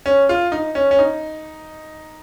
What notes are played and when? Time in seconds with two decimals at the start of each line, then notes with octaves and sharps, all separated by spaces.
0.06 C#4
0.29 F4
0.52 D#4
0.75 C#4
0.91 C#4
0.99 D#4